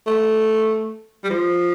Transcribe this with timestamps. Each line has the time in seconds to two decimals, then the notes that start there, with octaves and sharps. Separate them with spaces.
0.07 A3
1.24 G3
1.30 F3